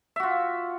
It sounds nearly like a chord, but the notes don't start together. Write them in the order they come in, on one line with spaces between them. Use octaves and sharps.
E5 F#4 F4